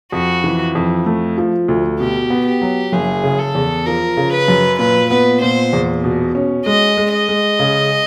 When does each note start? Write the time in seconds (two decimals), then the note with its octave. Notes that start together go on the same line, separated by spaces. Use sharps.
0.12 F2 F#4
0.44 E3
0.75 F2
1.06 A3
1.38 F3
1.68 D2
2.00 B2 G4
2.30 B3
2.46 G4
2.61 F#3
2.92 F#1 G#4
3.24 C#3
3.39 A4
3.55 E2
3.86 F3 A#4
4.17 C#3
4.33 B4
4.48 F#2
4.79 A#2 B4
5.11 B3 B4
5.41 A#2 C5
5.73 E2
6.04 B2
6.35 C#4
6.66 G#3 D#5
6.97 G#3
7.13 D#5
7.29 G#3
7.59 C#3